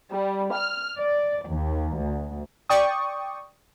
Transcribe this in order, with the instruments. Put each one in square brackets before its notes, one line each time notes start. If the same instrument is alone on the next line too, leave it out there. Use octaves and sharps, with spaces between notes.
[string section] G3
F6
D5
D#2
D2
[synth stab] D5 G5 C#6 D#6